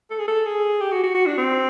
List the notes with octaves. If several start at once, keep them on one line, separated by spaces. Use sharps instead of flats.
A4
G#4
A4
G#4
G4
F#4
F#4
F#4
D4
C4